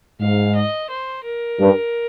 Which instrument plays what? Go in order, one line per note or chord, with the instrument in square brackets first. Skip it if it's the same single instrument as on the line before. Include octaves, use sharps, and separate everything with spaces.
[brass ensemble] G#2 [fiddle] F5
[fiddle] D#5
C5
A#4
[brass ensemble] G2